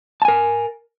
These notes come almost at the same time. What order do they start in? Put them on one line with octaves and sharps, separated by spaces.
A5 G#5 A#4